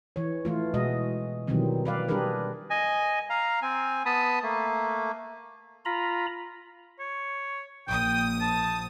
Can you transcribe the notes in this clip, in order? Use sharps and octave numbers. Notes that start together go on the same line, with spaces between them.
E3 C#5
E3 A3 F4
B2 G#3 F#4 D#5
B2 D#3 E3 F#3 G3 C4
B4 D5 F5
G3 D4 G4 G#4 A#4 B4
D#5 G#5
F5 A#5
C4 G#5
B3 A5 B5 D#6
A3 A#3
F4 A#5 B5
C#5
A#1 G5 D#6
A5